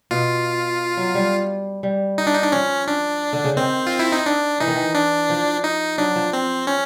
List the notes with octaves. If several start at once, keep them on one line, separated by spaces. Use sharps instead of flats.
B2 F4
F#3
G3
G3
D#4
D4
D#4
D4
F3 C#4
D4
D3
C#3
D#3 C4
F4
E4
D#4
D4
E3 D#4
D#3
E3
D4
F3
D#4
F#3 D4
F3
C4
C#4